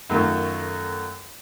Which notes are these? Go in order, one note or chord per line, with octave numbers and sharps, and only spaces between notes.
F#2 D#3 A3 F4